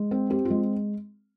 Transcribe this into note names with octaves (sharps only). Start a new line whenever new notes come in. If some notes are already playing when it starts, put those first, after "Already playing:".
Already playing: G#3
C4
C4 G4
F4
G#3